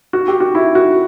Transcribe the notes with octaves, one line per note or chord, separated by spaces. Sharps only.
F#4
G4
F#4
E4
F#4